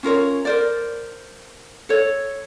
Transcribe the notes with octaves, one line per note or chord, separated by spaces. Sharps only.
C#4 F4 A#4 C#5
A#4 C5 D5
A4 C#5